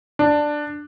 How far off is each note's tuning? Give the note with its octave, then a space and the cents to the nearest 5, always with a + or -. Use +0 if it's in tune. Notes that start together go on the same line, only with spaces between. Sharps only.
D4 +10